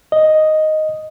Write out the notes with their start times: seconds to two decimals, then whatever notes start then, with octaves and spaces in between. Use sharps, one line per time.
0.12 D#5